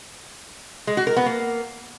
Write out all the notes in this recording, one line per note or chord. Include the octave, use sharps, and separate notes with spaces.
G#3
F#4
A#4
B3
A#3